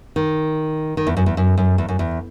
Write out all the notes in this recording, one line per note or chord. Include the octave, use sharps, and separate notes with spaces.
D#3
D#3
E2
F#2
E2
F#2
F#2
E2
F#2
E2